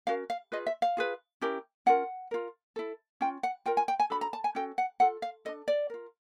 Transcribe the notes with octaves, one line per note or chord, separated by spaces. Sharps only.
C#4 F#4 A#4 F5
F5
F4 G#4 B4 D#5
E5
F5
F4 G#4 B4
C#4 E4 G4 A#4
C#4 F4 A#4 F#5
F4 A#4
E4 A4
C#4 F4 G5
F#5
F4 A#4 G5
G#5
G5
G#5
D4 F#4 A4 B5
A#5
A5
G#5
C#4 F#4 A4 G5
F#5
F4 A4 F#5
F5
D4 F4 A4 D#5
D5
F4 A#4